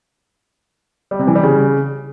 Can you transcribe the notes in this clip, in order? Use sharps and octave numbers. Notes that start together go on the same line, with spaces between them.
G3
C3
E3
G3
C#3